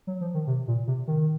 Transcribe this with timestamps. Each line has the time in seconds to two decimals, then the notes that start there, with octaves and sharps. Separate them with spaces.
0.07 F#3
0.21 F3
0.34 D#3
0.47 C3
0.68 A#2
0.87 C3
1.07 D#3